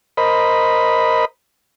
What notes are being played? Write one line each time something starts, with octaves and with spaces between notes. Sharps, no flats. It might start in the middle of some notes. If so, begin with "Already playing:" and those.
A#4 C5 D#5 B5